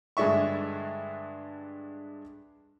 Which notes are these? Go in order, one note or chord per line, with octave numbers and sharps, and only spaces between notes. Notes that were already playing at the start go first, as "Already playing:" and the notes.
G2 D3 G#3 D4 E5 C#6